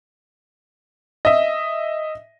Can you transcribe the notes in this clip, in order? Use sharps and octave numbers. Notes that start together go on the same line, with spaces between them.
D#5 E5